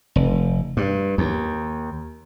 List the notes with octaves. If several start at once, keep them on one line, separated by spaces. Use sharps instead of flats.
F1
G2
D#2